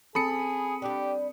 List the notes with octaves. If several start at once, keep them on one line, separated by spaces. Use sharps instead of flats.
C4 G#4 A4 B5 D#6 C#7
G3 D4 G4